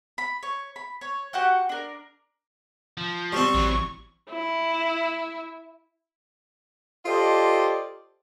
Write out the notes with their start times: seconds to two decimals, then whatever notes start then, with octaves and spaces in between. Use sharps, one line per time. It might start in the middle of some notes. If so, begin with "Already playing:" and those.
0.18 B5
0.43 C#5
0.76 B5
1.01 C#5
1.33 F#4 G4 F#5 G5
1.69 D4 A#4
2.97 F3
3.33 G3 C4 C#6
3.54 A1 E3 F#3
4.30 E4
7.06 F4 G4 A4 C5 D5 D#5